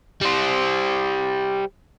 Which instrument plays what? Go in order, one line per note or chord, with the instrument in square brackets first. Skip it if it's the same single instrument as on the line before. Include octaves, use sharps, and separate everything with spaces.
[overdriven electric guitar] G3 C5